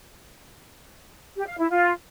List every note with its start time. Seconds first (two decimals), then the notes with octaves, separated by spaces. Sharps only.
1.36 G4
1.47 F5
1.59 E4
1.70 F4